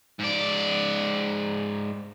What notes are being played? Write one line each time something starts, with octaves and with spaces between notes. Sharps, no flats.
G#2 D5